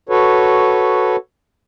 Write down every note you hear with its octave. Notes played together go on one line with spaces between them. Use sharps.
F#4 A4 B4 C#5